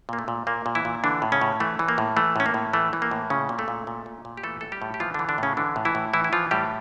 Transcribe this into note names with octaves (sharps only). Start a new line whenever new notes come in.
A#2 A#3
A3
A#2
A#2 A#3
A#2
E3 E4
A#2
D3 E3 D4
A2
C#3 C#4
A2
E3 A3
E3
A#3
A2
E3 A3
A2 C#4
A#3
A2
E3 A3
E3
A#3
A2
A#2 C#3 C#4
A#2
A3 A4
A#2
A#2
A#2
A#2
G4
E3 A3 A4
A2 A4
G3 G4
A2
G4
E3 F3 F4
D3 E3 D4
D3 D4
A2 C#3 C#4
D3 E3 D4
A2
E3 E4
A2
E3 E4
E4
E3 F3 F4
A2 G3 G4